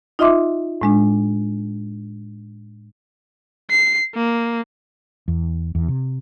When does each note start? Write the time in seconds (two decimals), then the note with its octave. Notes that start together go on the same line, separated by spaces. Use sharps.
0.19 D#4 F4 D#5 E5 C6 D6
0.81 A2 G#3 D4
3.70 C7
4.15 A#3
5.28 E2
5.75 E2
5.88 C3